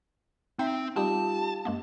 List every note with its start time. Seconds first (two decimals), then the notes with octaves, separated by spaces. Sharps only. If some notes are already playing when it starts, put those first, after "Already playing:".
0.59 C4 D#4 E5 G5
0.96 G3 D#4 F4 G4 A5 D#6
1.65 F#2 G#3 A#3